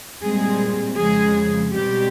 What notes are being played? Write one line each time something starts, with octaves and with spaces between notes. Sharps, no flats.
A#2 G3 G#3 C4 G#4
F2 C#3 F3 G#3 G#4
B2 G3 G#3 C4 G4